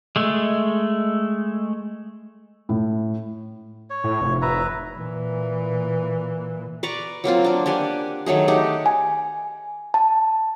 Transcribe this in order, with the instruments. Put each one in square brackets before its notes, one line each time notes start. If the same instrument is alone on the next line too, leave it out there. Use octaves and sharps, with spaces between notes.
[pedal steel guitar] G#3 A3
[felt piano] A2
[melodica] C#5
[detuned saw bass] A2
F1
[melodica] B4 E5 A#5
[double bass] A#2 E3
[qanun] B4 D5 A#5 C#6
F#3 A#3 C4 F4
A#3 D4
D4 G4 F#5 G#5
D#3 F#3 A3 G#4
A3 D#4 G4 F#5
[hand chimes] G#5
A5